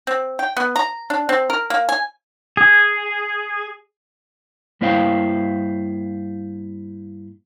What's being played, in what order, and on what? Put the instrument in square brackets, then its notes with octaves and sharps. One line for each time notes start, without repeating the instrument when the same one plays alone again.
[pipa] C4
G5
B3
A#5
D4
C4
A#4
A#3
G#5
[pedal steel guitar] G#4
[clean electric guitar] G2 A#3 E4 C5 F5 G5